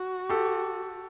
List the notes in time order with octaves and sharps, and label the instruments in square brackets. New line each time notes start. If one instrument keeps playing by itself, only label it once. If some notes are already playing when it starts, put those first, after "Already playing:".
Already playing: [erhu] F#4
[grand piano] G4 A4